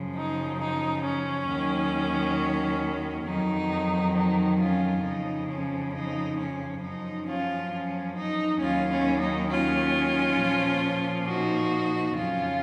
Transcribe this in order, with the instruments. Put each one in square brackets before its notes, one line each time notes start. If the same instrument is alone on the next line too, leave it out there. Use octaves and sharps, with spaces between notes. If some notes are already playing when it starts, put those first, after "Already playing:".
Already playing: [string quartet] F#2 C#3 F3
D#4
D#4
C#4
D#2 D#3 F#3
F2 D#3 F#3 D#4
D#4
C#4 F4
F2 C#3 F3 D#4
C#4
D#4
C#4
F#2 F3 D#4
C#4 F4
C#4
D#4
D#2 D#3 F#3 C#4 F4
C#4
D#4
C#4 F4
A#2 F3
D#4 F#4
F2 C#3 F#3 C#4 F4